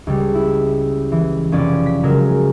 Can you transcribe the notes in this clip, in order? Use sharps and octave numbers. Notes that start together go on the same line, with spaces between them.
C#2 G3
E4
E3
F1 C#4 D5
B6
C#3 F#3 G#3 A#4